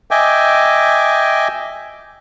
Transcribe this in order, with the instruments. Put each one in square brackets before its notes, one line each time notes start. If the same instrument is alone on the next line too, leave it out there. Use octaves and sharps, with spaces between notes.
[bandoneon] D#5 E5 G5 G#5 D6